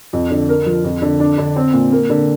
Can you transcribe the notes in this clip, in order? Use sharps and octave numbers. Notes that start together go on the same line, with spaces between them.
F2
D3
A#4
F3
F2
D3
D4
D3
C4
A#2
A#3
D3